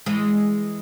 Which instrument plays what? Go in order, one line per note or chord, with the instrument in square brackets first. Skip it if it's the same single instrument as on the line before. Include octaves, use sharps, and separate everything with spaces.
[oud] E3 G#3